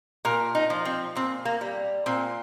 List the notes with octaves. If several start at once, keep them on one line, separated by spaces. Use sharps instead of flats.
A#2 A#4
D#4
F3
C4
A#2 C4
A#3
G3
A#2 C4